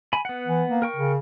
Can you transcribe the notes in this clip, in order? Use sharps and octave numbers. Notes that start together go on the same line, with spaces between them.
G#5 B5
B3 F#5
E3
A#3
A#4 G5 C#6
C#3